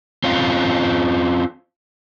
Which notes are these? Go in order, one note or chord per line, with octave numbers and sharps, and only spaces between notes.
C4 C#4 F4